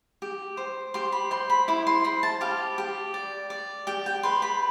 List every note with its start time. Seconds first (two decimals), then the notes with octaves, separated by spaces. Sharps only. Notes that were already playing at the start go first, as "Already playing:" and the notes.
0.22 G4
0.57 C5
0.94 G4 C6
1.12 B5
1.31 C5 C6
1.50 B5
1.68 E4 D6
1.87 C6
2.04 C5 B5
2.23 A5
2.41 G4 F5
2.78 G4
3.14 D5
3.50 D5
3.87 G4 G5
4.06 G5
4.23 B4 C6
4.42 B5